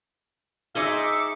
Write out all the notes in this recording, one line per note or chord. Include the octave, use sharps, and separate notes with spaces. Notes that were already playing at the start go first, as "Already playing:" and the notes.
D#4 G#4 C5 E5 D6 C#7